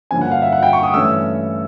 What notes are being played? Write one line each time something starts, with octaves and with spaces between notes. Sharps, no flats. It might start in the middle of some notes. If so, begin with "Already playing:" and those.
G2 D3 F3 A#3 C#4 G#5
F#5
F5
E5
F#5
G5
C#6
D#6
G2 E3 A3 C#4 E6